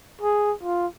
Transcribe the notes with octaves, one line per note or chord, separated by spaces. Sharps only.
G#4
F4